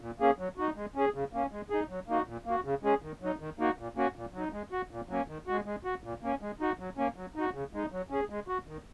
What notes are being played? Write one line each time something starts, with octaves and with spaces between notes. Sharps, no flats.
A#2
A#3 C#4 G#4
F#3
D#4 F#4
G#3
C#4 G#4
C#3
A#3 C#4
G#3
D#4 G#4
F#3
A#3 D#4 F#4
A#2
A#3 F#4
C#3
G#3 C#4 G#4
D#3
F#3 D#4
D#3
A#3 D#4 F#4
A#2
A#3 C#4 F#4
A#2
F#3 D#4
G#3
F#4
A#2
F#3 A#3 C#4
D#3
G#3 F#4
G#3
F#4
A#2
A#3 C#4
G#3
D#4 F#4
F#3
A#3 C#4
F#3
D#4 F#4
C#3
G#3 D#4
F#3
C#4 G#4
G#3
F#4
D#3